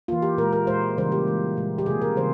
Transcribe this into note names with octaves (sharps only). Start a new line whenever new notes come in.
E3 A#3 F4
G4
A#2 G#3 A#4
A#4
A#2 G#3 C5
C#3 E3 G3 A#3 C5
G4
E3 G#3
A#2 G#3
G4
C3 F3 A#3 G#4
A#4
C#3 E3 G3 C5